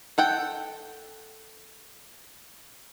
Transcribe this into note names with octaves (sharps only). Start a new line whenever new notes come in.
A4 F#5 G5